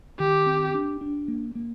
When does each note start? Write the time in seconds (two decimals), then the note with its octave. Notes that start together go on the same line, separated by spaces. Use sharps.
0.19 D#3 G4
0.46 C4
0.74 D4
1.01 D4
1.28 A#3
1.55 A#3